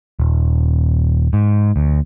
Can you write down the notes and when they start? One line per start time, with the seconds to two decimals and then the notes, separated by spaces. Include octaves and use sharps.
0.20 D#1
1.33 G#2
1.76 D2